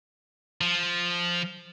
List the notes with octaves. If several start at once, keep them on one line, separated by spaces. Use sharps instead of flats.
F3